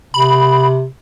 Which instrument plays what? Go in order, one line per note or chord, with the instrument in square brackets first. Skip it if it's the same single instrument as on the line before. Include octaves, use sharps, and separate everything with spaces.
[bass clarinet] C3 [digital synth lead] B5